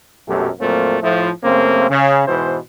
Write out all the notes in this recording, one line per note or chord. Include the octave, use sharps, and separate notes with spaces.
A#1 F#2 B2 F#3 A3 G4
F2 A#2 F#3 A3 A#3 C4
A2 F3 A3
F#2 C#3 A3 A#3 C4
C#3
G#2 B2 E3 C5